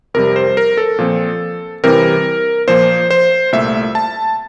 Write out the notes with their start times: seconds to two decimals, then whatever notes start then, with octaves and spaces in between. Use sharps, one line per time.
0.14 F2 C3 G3 A#4
0.36 C5
0.57 A#4
0.77 A4
0.98 A#2 F3 C4
1.84 C3 E3 G3 C4 A#4
2.68 A#2 F3 A#3 C5
3.11 C5
3.52 C2 A#2 A3 E5
3.95 A5